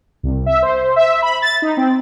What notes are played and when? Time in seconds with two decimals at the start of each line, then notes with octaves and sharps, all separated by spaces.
0.23 C2
0.46 E5
0.62 C5
0.96 E5
1.22 B5
1.42 A6
1.62 D#4
1.77 C4